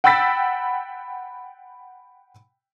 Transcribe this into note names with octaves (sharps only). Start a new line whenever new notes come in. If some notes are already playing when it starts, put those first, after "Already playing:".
F#5 G5 B5 E6 A6 B6